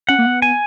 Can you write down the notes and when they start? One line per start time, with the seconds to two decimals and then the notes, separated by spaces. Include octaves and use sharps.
0.09 C#4 F#5
0.19 A#3
0.26 B3
0.42 G#5